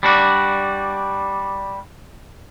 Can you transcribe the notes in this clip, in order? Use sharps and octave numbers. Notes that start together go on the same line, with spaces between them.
G3 D4 F#4